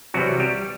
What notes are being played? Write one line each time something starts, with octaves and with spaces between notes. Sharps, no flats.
C2 C3 E3 F#3 G3 F#4
G3 G4